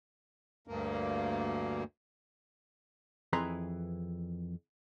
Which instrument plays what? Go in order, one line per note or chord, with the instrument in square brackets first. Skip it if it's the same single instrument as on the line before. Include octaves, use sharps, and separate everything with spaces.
[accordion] D2 G2 A#3
[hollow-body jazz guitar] F2 E3 G#4 B4 A#5 C6